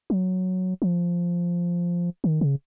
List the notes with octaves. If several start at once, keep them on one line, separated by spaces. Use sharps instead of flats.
F#3
F3
D#3
C#3